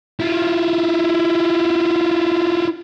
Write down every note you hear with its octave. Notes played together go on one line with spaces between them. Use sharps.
E4 F4